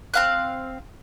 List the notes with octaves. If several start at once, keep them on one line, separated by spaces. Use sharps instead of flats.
C4 F5 F#6